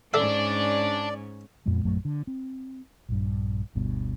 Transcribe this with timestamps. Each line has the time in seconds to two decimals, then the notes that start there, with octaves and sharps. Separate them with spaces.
0.14 G#2 C#4 D4 A4 D5 E5
1.66 F2 A#2 G#3 B3
1.85 A#1 F#2 F#3 A3
2.05 D3
2.27 C4
3.09 A#1 G2
3.75 G1 D2 G2 B2